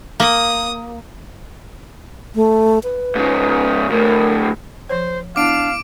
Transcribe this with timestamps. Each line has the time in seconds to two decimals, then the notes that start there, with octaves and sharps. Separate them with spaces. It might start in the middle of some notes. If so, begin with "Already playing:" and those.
0.20 A#3 D#6
2.35 A3
2.84 B4
3.15 G#2 C#3
3.90 D2 A2 A#4
4.89 F3 C5 C#5
5.36 B3 D4 E4 F5 D6 D7